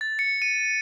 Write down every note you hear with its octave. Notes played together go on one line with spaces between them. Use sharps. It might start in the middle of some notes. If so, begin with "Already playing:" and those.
A6
C#7
D#7